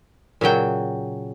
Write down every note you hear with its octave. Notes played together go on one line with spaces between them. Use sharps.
A#2 C#3 F#3 G5